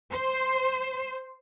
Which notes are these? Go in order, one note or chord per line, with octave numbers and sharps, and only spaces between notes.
C5